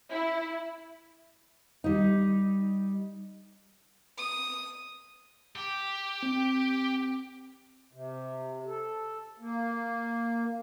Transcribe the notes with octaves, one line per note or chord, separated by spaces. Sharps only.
E4
G3 D#4
D#6
G4
C4
C3
A4
A#3